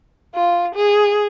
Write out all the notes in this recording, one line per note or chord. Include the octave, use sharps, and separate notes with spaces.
F4
G#4